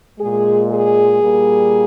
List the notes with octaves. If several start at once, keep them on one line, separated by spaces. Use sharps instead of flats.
A#2 G#3 G#4
G#4
A#2 G3 A#3